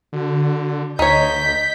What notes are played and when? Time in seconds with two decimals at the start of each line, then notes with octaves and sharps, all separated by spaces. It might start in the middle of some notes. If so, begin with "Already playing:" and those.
0.13 D3 F#4
0.99 D2 D#4 C#5 D#5 G6 B6